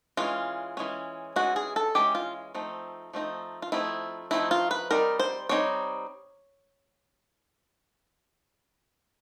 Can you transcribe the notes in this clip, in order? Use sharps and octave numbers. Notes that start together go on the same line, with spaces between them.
E3 G#3 C#4 F4
E3 G#3 C#4
E3 G#3 C#4 F#4
G#4
A4
E3 G#3 C#4 G4
F4
F3 A3 C4 D#4
F3 A3 C4 D#4
F4
F3 A3 C4 D#4 E4
F3 A3 C4 D#4 E4
F4
B4
G3 C4 D#4 A#4
C5
G3 C4 D#4 C#5